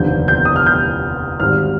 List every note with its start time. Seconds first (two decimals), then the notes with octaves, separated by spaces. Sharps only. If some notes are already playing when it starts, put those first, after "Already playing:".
Already playing: F1 D#2 D3 F3 G6
0.28 G6
0.45 D#6
0.56 F6
0.66 G6
1.40 G#1 G#2 G3 F6